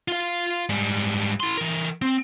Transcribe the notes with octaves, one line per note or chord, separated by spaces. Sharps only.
F4 F5
G#2 G3
E4 C6
E3 A#4
C4